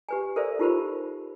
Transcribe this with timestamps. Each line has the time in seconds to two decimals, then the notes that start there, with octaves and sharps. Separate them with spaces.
0.09 G4 B4 G#5
0.36 A4 A#4 C5 D5 E5
0.59 D#4 F4 G4 A#4 C5 B5